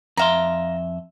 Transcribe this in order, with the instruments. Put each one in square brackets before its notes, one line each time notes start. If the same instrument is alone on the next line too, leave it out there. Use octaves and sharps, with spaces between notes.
[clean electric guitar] F2 E5 C6 [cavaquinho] F5 A#5